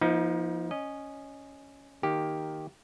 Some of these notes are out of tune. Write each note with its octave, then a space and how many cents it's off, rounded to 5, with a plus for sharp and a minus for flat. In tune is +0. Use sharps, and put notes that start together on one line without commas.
F3 -15 A#3 +40 D#4 +30
C#4 +0 D#5 -15
D#3 +0 A#3 +0 G4 +0